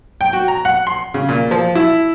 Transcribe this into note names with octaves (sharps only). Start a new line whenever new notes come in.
G5
F#4
A#5
F#5
C6
C#3
A#2
F3
E4